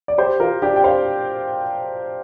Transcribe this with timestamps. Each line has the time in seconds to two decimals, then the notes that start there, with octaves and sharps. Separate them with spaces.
0.08 D5
0.18 G4 C5
0.40 F4 A#4
0.62 D4 G4
0.76 G5
0.84 C5 F5